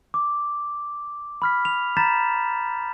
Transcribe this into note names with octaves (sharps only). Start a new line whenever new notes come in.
D6
B5 F6 B6
F7
A#5 B5 G6 A6 B6 E7